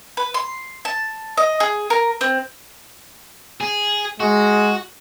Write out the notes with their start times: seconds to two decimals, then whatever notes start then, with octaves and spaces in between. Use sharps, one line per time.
0.17 B4
0.34 C6
0.85 A5
1.37 D#5
1.60 G#4
1.90 A#4
2.21 C4
3.61 G#4
4.20 G#3 F#4